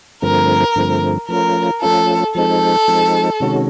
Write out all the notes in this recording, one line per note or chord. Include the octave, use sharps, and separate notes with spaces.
G2 D3 F3 A3 C4 A#4
G2 D3 F3 A3 C4
F3 A3 C#4 F4 A#4
F3 A3 C#4 F4 A4
F3 G#3 C4 D#4 A4
F3 G#3 C4 D#4
C3 D#3 G#3 C#4 F#4